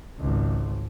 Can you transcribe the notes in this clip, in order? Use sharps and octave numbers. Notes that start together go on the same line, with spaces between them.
G#1 C#2